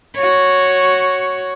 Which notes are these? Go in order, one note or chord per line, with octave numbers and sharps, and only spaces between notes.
F#4 C#5